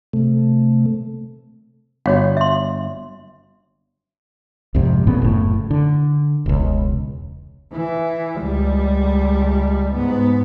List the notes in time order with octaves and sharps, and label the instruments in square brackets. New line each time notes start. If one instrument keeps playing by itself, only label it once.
[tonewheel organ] C3 A3
[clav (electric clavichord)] G1 [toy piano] F#4 C#5 F5
[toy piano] E5 C6
[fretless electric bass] C2 F2 G#2 C3
A1 A#2 C#3 B3
F#1 A2
D3
E1 C#2
[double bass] E3
C#2 G3
G#2 B3